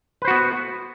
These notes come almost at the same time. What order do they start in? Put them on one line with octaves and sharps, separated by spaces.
B4 C5 F#4 B3